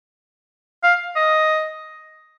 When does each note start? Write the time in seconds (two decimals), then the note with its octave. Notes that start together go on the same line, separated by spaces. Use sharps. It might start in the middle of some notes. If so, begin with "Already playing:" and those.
0.84 F5
1.16 D#5